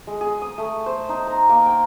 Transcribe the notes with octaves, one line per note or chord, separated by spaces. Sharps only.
G#3
G#4
D#6
A3
C5
D#4
A#5
A#3
G5